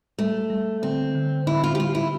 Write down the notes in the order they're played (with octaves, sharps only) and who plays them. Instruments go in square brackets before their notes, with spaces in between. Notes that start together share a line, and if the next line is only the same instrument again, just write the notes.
[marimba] G3 [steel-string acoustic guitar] A3
[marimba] G3
[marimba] D3 [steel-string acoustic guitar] C4
[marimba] D3
[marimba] D3 [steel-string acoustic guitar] E4
[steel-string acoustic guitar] F4
G4
[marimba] G3 [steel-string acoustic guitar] F4
[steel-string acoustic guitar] E4